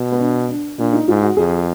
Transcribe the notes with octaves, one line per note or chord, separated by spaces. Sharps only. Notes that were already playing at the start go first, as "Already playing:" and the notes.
Already playing: B2
B3
D4
D4
A#2 D4
D#4
G#2 F4
F#4
F2 G#4